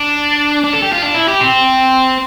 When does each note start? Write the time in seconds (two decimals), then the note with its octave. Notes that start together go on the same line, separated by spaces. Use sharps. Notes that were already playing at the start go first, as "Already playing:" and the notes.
Already playing: D4
0.64 D4
0.74 A4
0.83 G4
0.93 F4
1.03 D4
1.15 E4
1.28 G4
1.40 C4